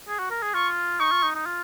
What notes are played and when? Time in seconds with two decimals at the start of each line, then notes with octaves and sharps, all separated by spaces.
0.08 G#4
0.19 F#4
0.31 A#4
0.42 G#4
0.54 F4 C#6
1.00 D#4 C#6
1.12 F4
1.23 D#4
1.35 D#4
1.46 F4